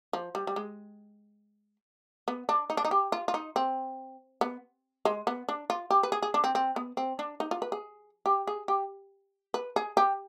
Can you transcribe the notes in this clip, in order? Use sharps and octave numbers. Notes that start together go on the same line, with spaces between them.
F3
G3
G3
G#3
B3
D4
D#4
D4
D#4
G4
F4
F4
D#4
C4
B3
G#3
B3
D4
F4
G4
B4
G#4
G#4
D4
C4
C4
B3
C4
D4
D#4
F4
B4
G#4
G4
G#4
G4
B4
G#4
G4